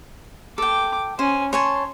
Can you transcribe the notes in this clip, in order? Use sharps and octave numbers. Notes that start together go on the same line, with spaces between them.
A4 G5 D6
C#4 C5 G#5
C#5 G#5 A5 C6